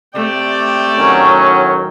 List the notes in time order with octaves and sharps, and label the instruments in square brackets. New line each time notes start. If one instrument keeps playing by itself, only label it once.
[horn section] C3 D5 [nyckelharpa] A3 G5
[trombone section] A2 D#3 F#3 [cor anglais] C#4